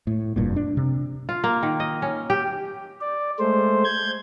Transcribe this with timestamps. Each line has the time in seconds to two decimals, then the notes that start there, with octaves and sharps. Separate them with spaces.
0.07 A2
0.36 F1 G2 A#2
0.56 D4
0.77 C3
1.29 F4
1.44 A#3
1.63 D#3
1.80 D#5
2.02 C#4
2.30 G4
3.01 D5
3.39 G#3 A3 C5
3.84 G6 G#6